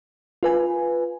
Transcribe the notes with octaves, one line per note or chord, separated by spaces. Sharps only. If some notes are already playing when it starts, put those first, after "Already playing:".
F4 B4 G#5